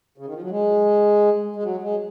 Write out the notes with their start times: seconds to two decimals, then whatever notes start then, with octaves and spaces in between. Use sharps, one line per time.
0.18 C#3
0.26 D#3
0.34 F3
0.42 F#3
0.50 G#3
1.56 G#3
1.63 F#3
1.82 G#3